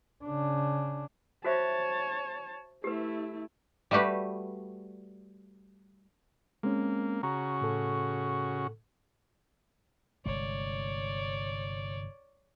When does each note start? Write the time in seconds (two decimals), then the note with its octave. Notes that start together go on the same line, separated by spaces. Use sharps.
0.25 C#3 D4
1.44 F#4 C5 C#5 E5 A5
2.84 A3 E4 G4 B4
3.91 G3 A3 F#4 G4 B4
6.63 G#3 A#3 C4 C#4
7.23 C#3 F#4 A#5
7.61 A2 A4
10.26 G1 C3 G#3 C#5 D5